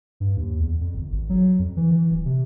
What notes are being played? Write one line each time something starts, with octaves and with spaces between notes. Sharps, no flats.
G2
D#2
E2
F2
G1
G#1
F#3
F2
E3
E3
D1
C3